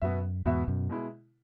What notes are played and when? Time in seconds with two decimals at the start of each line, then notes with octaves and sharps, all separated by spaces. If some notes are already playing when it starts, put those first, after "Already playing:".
0.02 F#2 B2 B3 F#4 B4 E5
0.45 E2 G#2 B2 B3 F#4 B4 E5
0.68 F#2 B2
0.89 B2 G#3 E4